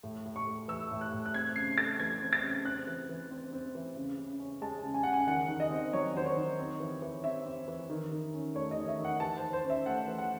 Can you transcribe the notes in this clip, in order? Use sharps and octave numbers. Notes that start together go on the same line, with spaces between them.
A2
A2
C#6
A3
E3 E6
A2
F#6
A2
F#6
C4 G#6
C#3 C7
A3 A6
E3 G#6
C4
A6
C#3
C4 F#6
E3
E3
C4
C4
E3
C#3
C#3
C#4
G#3 A5
C#3
G#5
C#3 F#5
G#5
D#3 F#5
D#3
D#5
C4
F#3 C#5
D#3 C5
C#5
D#3
C4
E3
E3
C4 E5
C4
E3
D#3
D#3
C#4
A3 C#5
D#5
D#3
E5
D#3
F#5
E3 A5
C5
E3
C5
C#4
E5
A3 F#5
E3
F#5